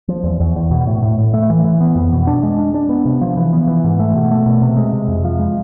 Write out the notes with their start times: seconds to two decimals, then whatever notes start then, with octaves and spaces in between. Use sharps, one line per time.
0.08 F3
0.24 E2
0.40 E2
0.56 E2
0.71 B2
0.87 A2
1.02 A2
1.18 A2
1.33 A3
1.50 E3
1.64 E3
1.81 B3
1.95 F2
2.12 B2
2.27 D4
2.43 G#3
2.59 D4
2.74 D4
2.89 B3
3.05 C3
3.21 F3
3.37 E3
3.53 B3
3.67 E3
3.84 G#2
4.00 A3
4.15 B2
4.31 A3
4.46 B2
4.62 C3
4.77 G#3
4.93 C3
5.08 F2
5.24 F3
5.39 G#3